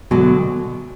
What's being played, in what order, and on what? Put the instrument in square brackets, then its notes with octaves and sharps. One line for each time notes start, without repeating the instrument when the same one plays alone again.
[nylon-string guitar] D2 D3 F#3 [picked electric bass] B2